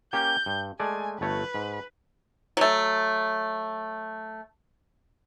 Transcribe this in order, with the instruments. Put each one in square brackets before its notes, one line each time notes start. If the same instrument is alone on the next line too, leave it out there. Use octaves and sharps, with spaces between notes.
[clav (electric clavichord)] A#3 C#4 G4 [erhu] G6
[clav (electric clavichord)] G2
[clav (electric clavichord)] G#3 A3 D5 [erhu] G#5
[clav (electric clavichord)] G1 A3 C#5 [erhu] B4
[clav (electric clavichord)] G#2
[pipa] F#3 A3